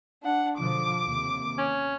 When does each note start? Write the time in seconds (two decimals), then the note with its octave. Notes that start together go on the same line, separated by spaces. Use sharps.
0.23 D4 F#5
0.58 B2 D3 F3 D6
1.03 D#2 C3
1.58 C#4